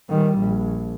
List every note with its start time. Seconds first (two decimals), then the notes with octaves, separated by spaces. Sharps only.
0.10 D#3 G3
0.39 A#1